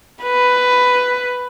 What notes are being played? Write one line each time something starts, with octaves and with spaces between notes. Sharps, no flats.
B4